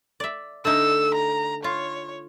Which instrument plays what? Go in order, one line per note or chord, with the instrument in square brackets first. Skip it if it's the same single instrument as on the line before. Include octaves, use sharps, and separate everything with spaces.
[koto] D5 E5
[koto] D3 A3 D#4 [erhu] E6
[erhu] A#5
[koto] F4 [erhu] C#5